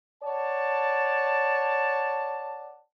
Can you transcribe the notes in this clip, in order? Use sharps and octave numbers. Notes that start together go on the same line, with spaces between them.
C#5 D5 F#5 A5